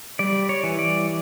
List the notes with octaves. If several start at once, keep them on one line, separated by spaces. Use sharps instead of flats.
G3 D5
C#5
E3
D5